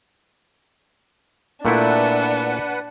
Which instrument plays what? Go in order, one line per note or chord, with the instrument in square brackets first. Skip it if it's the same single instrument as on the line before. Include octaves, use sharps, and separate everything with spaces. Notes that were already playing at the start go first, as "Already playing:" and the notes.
[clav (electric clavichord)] A#2 A3 E4 [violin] D4 [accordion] B4 F#5